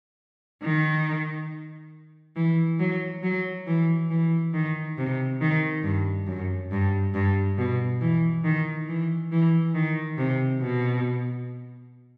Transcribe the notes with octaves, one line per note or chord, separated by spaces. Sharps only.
D#3
E3
F#3
F#3
E3
E3
D#3
C3
D#3
G2
F#2
G2
G2
B2
E3
D#3
E3
E3
D#3
C3
B2